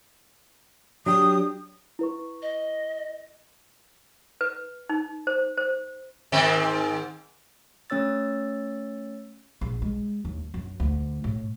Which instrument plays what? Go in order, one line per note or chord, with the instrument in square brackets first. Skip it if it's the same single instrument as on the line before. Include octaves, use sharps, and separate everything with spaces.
[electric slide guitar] F#3 D4 G4 [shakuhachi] D#6
[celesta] E4 B4 C#6
[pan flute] D#5
[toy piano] B4
D#4
C5
C5
[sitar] G#2 D#3 C4
[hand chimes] A3 C#4 C#5 E6 A6
[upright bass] A#1
G#3
D#2
F#2
D2
A2